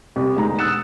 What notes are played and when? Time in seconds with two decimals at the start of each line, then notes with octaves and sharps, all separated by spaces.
0.16 C2
0.36 E1 D3 G#3 D#4 A#5 B5
0.59 D#6 E6 F#6 A6 C#7 E7